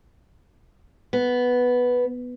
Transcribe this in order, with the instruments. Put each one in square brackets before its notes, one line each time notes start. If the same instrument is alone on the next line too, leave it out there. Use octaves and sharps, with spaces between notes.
[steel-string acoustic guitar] B3